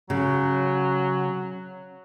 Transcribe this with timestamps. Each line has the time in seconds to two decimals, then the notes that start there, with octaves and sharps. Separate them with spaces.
0.10 C#3 F#3